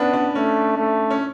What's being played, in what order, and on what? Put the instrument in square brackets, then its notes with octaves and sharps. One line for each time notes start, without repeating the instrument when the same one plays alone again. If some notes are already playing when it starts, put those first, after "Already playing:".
Already playing: [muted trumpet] B3 [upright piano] C#4 D4
[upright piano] D4
[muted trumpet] A3 [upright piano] C#4
[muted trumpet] A3
[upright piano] C#4